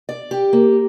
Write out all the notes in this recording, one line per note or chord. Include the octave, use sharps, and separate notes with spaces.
D5
G4
A#3